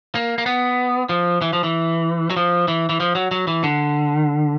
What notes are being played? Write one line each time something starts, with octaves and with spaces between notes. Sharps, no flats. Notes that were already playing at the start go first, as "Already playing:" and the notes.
A#3
A#3
B3
F3
E3
F3
E3
F#3
F3
E3
E3
F3
F#3
F#3
E3
D3